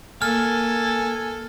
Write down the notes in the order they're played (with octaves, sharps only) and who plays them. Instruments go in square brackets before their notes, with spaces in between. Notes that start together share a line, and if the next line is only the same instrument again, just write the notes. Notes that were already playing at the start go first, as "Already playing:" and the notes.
[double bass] A#3 [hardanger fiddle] A4 [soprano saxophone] G#5 [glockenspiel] F6